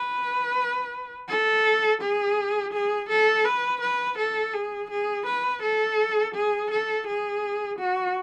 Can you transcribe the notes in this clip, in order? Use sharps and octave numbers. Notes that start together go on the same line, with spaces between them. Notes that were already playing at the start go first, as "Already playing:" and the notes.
Already playing: B4
A4
G#4
G#4
A4
B4
B4
A4
G#4
G#4
B4
A4
G#4
A4
G#4
F#4